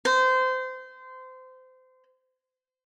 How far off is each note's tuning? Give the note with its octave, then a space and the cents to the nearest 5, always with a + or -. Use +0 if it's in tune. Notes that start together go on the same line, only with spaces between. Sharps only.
C5 -25